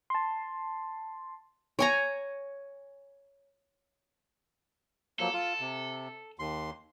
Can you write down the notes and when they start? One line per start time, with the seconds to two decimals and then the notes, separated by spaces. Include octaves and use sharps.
0.10 A5 C6
1.79 C#5 G#5 A#5
5.19 F3 F#3 A#3 A4
5.33 F4
5.60 C3
6.39 D#2 C6